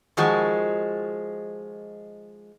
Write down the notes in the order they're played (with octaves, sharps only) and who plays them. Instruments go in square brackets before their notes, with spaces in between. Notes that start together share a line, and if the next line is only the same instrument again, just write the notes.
[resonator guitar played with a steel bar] D#3 F3 G#3 F#4